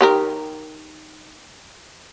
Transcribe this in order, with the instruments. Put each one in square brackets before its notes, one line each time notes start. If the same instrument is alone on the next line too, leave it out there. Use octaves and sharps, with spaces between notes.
[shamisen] D#3 G4 A#4